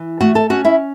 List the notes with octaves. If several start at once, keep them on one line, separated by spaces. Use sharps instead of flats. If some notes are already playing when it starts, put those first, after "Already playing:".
Already playing: E3
A3 F#4 F#5
A4 A5
C#4 F#4 F#5
E4 E5